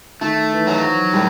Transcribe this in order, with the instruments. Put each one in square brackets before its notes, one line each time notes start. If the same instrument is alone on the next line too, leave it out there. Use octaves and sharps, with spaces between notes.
[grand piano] D#3 [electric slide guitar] A3
[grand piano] E3
[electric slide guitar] F#3
[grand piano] F3
[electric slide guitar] A2 [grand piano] G3